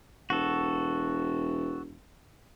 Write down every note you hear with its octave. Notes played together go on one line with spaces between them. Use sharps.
E1 F#4 A4